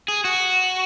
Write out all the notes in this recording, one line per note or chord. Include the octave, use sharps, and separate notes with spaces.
G#4
F#4